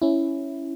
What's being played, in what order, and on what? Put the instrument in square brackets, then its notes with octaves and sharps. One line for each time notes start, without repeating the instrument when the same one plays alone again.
[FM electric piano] C#4 E4